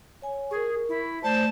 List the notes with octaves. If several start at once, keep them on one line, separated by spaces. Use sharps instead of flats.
C#5 G#5
G#4 A#4 C#6
E4
A3 C5 D5 A5